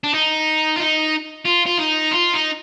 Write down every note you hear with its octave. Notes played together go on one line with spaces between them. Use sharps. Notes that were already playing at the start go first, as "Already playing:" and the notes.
D4
D#4
F4
D#4
F4
F4
D#4
F4
D#4